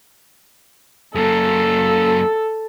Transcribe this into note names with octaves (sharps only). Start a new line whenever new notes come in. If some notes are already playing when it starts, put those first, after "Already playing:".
F#2 A#3 A4